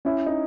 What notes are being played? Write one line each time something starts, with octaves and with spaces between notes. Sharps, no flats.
C#4 E4
D#4